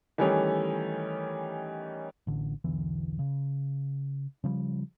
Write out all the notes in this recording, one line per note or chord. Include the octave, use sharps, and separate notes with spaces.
D#3 E3 G3 A3 C#4
A1 D3
B1 E2 D3 E3
C#3
C#3 F3 G3